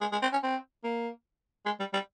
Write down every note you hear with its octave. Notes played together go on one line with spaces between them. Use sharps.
G#3
G#3
C4
C#4
C4
A#3
G#3
G3
G3